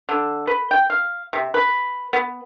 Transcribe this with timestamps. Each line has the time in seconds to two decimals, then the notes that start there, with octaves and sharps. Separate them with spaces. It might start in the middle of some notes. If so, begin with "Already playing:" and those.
0.09 D3
0.47 B4
0.71 G5
0.90 F5
1.33 C3
1.54 B4
2.13 B3